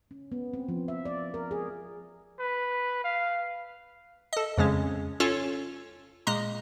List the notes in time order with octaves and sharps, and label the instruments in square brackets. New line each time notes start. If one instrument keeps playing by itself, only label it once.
[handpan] C#4
B3
C4
F3
E5
D5
A#4
G#4
[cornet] B4
F5
[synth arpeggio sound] A4 D#5
F2 C#3 G#3 C#4
C#4 F4 A4 C#5
A#2 G#3 D#5 A#5